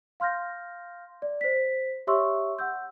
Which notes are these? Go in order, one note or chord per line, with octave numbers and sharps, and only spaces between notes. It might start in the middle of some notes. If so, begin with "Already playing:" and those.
F5 C6 F6 G6 A#6
D5
C5 B6
G4 C#5 E5 C6 C#6 E6
F#5 E6 G6